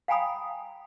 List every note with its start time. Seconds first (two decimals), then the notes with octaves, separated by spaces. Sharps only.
0.08 F5 G5 G#5 A#5 B5 D#6